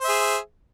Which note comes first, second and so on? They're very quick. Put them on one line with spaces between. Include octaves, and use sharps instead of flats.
C5 E5 G#4